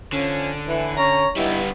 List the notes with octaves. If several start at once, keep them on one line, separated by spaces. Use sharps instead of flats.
D3 F3 C#4
A2 E3
C#4 C#5 A#5
G2 G3 B3 D#4 E4